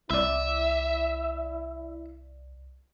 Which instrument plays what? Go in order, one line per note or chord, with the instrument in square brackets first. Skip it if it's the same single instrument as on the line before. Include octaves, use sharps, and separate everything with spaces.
[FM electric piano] C2 D5 [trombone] E4 [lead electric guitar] E5